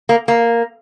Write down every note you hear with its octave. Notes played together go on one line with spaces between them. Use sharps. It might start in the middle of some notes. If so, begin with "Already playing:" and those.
A#3
A#3